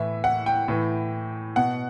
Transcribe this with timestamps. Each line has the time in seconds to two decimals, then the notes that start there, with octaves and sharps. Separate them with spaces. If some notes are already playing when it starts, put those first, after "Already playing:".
Already playing: A2 E3 E5
0.24 F#5
0.46 G5
0.68 A2 E3
1.56 B2 F#5